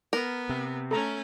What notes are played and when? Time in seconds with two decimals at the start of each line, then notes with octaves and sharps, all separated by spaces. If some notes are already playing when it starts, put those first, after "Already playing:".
0.13 B3 A#4
0.49 C3
0.91 A3 C#4 A4 A#5